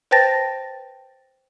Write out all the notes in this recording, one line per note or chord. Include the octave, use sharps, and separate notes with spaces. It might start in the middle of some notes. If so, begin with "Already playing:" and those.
B4 C5 G5 A5 A6 A#6